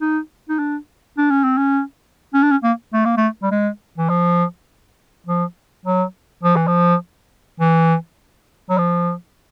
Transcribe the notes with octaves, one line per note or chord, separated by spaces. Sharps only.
D#4
D#4
D4
D4
C#4
C4
C#4
C#4
D4
C#4
A#3
A3
A#3
A3
G3
G#3
E3
F3
F3
F#3
F3
E3
F3
E3
F#3
F3